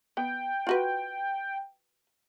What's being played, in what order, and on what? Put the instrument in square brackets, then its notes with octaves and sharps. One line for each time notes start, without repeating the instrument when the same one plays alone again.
[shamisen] B3 [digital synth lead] G5
[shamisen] F4 F#4 B4